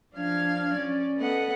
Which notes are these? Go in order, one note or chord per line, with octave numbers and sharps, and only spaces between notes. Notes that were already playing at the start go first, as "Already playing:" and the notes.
F3 D4 F5 F6 G#6
C#4 D5
B3 A4 D#5 F#5